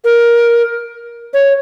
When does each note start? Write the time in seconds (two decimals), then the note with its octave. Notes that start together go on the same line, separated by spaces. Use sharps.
0.04 A#4
1.34 C#5